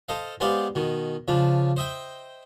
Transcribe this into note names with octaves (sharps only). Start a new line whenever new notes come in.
A4 C5 D#5 F5
G#3 B3 G4 C5 D5 F5
B2 D#3
C#3 F3 D4
C5 D#5 E5 G5